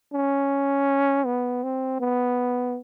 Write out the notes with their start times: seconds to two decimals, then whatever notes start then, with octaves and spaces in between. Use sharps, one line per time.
0.14 C#4
1.25 B3
1.63 C4
2.00 B3